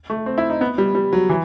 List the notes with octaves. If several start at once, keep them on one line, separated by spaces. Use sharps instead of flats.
A3
C4
E4
D#4
B3
G3
G3
F#3
E3